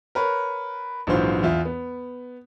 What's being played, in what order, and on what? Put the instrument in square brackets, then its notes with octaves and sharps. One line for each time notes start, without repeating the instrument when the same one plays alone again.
[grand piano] A#4 B4 C#5
A#1 G#2 E3 F#3 F4 C5
E2 F4 E5
B3